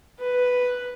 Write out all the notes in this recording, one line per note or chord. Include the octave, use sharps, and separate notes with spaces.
B4